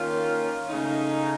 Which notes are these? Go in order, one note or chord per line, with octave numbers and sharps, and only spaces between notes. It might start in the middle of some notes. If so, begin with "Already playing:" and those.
Already playing: D#3 A#3 C#4 F4
C#3 A3 D#4